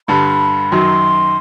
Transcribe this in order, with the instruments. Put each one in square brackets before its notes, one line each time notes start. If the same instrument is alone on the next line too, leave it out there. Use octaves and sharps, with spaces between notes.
[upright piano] G2 D3 G3 [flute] B5
[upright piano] F#2 D#3 F#3 [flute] C6